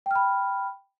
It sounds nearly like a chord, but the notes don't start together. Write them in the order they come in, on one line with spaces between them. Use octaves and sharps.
G5 F6 B5